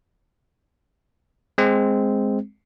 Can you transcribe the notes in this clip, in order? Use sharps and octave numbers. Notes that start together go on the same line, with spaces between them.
G#3 C4